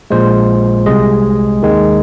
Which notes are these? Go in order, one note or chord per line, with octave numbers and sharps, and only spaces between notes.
A#1 A#2 G#3 C5
C2 C3 G#3 D#5
D#2 D#3 G#3